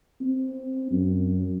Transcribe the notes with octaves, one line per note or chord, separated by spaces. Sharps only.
C4
F#2